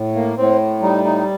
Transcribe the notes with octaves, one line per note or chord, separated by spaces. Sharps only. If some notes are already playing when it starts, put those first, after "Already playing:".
Already playing: A2
A#3
A2 C4
G3 D#4
D#4